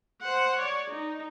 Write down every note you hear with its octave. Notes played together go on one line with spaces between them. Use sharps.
C5 F#5
C#5 D5
D#4